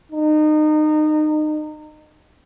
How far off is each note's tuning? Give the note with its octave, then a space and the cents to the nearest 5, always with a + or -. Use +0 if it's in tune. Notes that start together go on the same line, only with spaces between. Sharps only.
D#4 -25